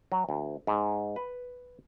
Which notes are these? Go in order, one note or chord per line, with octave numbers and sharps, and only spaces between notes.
F#3
D2
G#2
B4